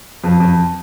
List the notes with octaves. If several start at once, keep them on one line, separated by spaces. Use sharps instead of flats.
F2
F2